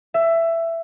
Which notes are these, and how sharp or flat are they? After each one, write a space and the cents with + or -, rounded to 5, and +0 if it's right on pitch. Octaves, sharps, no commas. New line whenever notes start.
E5 +15